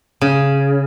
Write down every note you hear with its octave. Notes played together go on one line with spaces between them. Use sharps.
C#3